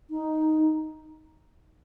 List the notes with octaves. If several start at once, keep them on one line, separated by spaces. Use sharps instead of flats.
D#4